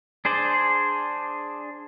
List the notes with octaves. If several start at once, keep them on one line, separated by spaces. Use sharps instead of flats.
D4 G#4 C5 D5